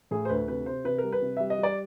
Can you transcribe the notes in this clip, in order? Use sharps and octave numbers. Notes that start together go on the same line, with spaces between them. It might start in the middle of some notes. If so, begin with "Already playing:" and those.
A2 G#4
C5
D2 B4
C3 B4
C3 C5
C3 B4
G3 A#4
B4
C3
G3 E5
D#5
G3
D5